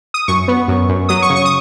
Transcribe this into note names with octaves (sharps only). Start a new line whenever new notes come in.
D#6
F#2 C#6
B3
F#2
F#2
F#3 D#6
C#6
C#3
C#6
D#6